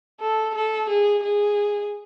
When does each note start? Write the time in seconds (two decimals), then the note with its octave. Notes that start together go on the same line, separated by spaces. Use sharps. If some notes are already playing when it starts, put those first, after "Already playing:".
0.21 A4
0.55 A4
0.89 G#4
1.23 G#4